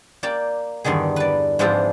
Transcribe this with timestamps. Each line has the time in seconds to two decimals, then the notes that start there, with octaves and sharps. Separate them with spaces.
0.23 A#3 D5 G5
0.84 E2 G2 D3 D#3 G#4
1.16 B4 D5
1.59 G#2 E3 F3 C4 D4 F4